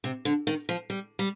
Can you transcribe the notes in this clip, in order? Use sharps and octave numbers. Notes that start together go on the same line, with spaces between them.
C3
D3
D#3
F3
G3
G3